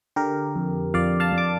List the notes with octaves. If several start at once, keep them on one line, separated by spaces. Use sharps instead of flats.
D3 G4 A#4
F2
F2 D5 F5
F5 A5
F2
D6